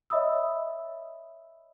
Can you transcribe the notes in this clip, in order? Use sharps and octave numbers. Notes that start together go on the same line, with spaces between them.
C#5 D#5 E5 B5 D#6 E6